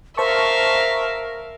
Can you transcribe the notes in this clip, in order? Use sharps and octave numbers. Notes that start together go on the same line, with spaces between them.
A#4 C5 E5 F5 A5 C#6